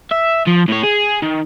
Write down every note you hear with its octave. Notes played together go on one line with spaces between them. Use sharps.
E5
F3
A2 C#5
G#4
D#3